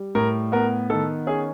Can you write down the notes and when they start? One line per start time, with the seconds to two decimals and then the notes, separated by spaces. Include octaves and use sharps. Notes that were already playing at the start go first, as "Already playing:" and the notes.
Already playing: G3
0.15 A2 A#4
0.52 B3 A#4
0.90 D#3 A4
1.27 C#4 G#4